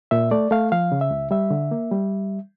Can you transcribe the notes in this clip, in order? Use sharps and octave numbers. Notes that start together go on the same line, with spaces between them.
A#2 E5
A3 D5
A3 F5
F3 F5
C#3
E5
C#2
G3 E5
D3
A#3
G3